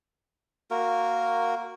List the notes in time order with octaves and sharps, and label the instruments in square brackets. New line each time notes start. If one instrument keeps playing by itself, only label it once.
[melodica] A#3 F#4 A#4